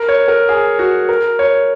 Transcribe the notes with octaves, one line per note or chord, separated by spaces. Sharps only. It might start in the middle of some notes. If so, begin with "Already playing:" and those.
Already playing: A#4
C#5
A#4
G#4
F#4
A#4
C#5